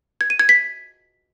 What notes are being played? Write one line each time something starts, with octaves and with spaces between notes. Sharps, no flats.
G#6
D#7
G#6
B6